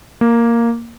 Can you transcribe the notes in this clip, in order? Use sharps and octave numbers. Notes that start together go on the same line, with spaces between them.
A#3